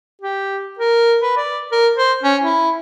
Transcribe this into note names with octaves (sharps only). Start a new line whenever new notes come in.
G4
A#4
B4
D5
A#4
C5
C#4
E4